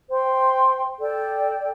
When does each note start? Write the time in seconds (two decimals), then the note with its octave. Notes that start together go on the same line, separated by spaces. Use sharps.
0.09 C5 G5 C6
0.99 A4 D5 G5